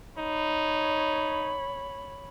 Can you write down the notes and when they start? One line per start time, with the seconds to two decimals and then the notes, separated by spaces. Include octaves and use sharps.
0.19 D#4 C#5 B5